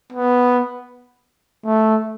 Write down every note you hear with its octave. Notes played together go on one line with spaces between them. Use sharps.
B3
A3